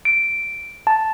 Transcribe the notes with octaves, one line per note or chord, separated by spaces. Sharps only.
D7
A5